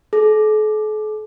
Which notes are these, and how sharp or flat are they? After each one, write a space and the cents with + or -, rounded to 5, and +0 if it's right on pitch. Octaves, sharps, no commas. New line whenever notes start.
A4 -45